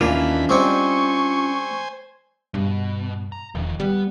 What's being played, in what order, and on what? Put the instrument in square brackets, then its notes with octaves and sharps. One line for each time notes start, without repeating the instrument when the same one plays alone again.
[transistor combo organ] D#2 E3 B5 [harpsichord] A#3 [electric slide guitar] C#4 D4 F4
[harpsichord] G3 C4 D#4 [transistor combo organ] C5 G#5 [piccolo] C#6
[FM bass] G2 [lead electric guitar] B2
[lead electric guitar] A#5
[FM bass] E1 [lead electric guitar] D#3 F3
[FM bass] G3 [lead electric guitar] B3